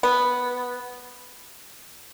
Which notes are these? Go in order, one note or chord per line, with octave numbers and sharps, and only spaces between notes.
B3